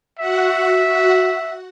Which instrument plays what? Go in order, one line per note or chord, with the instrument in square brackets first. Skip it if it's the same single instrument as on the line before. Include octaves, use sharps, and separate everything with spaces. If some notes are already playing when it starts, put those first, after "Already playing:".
[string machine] F#4 F#5 [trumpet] E5
[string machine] F#4 F#5